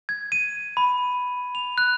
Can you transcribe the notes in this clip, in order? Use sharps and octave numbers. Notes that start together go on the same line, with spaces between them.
G#6
D#7
B5
F7
F#6